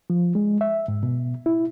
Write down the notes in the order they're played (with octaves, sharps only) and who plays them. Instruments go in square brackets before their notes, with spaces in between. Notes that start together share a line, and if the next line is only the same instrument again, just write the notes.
[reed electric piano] F3
G#3
E5
G#2
B2
E4